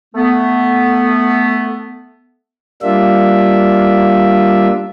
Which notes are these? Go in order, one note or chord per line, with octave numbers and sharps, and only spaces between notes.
A3 B3
G3 A#3 D4 F4 E5